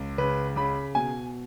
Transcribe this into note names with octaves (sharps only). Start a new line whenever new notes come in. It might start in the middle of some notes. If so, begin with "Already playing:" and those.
Already playing: C#2
C#3 B4
C#3 B5
B2 G#5